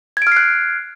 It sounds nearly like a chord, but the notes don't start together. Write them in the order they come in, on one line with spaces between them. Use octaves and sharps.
G#6 D7 F6 C7 F#6